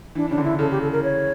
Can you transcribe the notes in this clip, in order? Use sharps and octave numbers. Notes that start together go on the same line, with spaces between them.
E3 D4
C#3 D4
D3
E4
C#3 A4
G4
A4
A#4
C#5